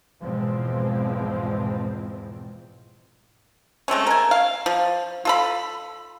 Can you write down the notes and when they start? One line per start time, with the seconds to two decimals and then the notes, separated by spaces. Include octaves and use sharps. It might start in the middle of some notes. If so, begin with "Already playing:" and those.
0.21 E2 G#2 B2 F3 G#3 C4
3.88 G#3 A3 C4 C#4
4.07 A#4 G#5
4.31 F5
4.66 F3
5.25 F4 A4 B5